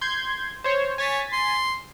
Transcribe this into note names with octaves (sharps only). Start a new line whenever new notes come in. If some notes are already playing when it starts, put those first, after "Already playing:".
C6 G6 G#6
C5 C#5 C#6
C#5 G#5 A6 B6
C6